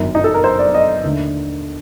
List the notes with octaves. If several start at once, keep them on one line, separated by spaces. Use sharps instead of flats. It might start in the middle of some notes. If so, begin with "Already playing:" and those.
Already playing: G1 F#2 D#3
D#4
A4
A#4
C5
D5
D#5
D#2 D3 A3